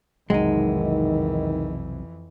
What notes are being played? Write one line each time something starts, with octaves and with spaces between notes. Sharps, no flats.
B1 F2 C3 D#3 E3 F#3 G#3 D#4